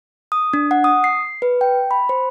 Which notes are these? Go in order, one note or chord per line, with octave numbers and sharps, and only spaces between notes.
D#6
D4
F#5
D#6
C7
B4
G5
B5
C5